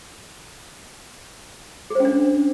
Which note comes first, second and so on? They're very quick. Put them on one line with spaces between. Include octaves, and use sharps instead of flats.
G#4 C5 C#4 D4